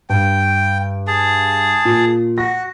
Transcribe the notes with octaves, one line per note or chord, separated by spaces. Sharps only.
G2 G5
G#4 A5
A#2
F#4 A#6